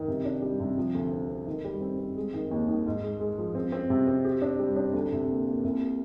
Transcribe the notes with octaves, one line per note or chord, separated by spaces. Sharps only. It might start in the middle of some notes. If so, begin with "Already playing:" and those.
Already playing: D#3
C3
D4
G3
C3
F3
D2
C4
C4
D#3
G3
C4
C4
G#3
D#3
D#2
D#3
G#2
G#3
G#3
F3
C4
C4
C3
C4
G4
D4
G3
D4
D2
C3
A#3
A#3
C2